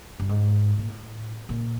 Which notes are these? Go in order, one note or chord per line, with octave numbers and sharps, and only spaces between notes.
G2
G#2
A#2
A2
A#2